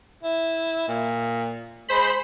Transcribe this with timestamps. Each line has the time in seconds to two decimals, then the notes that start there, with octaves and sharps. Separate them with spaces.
0.23 E4
0.88 A#2
1.89 G#3 C5 B5